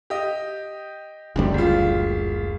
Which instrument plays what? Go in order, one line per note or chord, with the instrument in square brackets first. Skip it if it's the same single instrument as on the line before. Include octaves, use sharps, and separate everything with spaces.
[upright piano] G4 D#5
[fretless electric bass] F#1 D2 G3
[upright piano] E1 F4